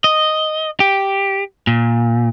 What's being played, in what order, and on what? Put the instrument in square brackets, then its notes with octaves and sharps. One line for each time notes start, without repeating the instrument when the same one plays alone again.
[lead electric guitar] D#5
G4
A#2